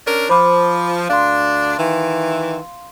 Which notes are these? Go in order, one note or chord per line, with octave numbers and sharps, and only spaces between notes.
C#4 D4 A#4
F3 C5 B5 D6
D2 D4 F5 C6
D#3 E3